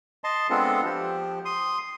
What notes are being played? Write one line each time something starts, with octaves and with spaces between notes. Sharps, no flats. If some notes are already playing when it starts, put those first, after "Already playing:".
D#5 A5 C6
G#3 B3 C4 D4 F4 A4
F3 G4
C6 D#6